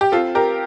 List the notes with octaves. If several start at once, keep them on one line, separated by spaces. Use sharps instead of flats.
G4
C4 F4 A4
G4 A#4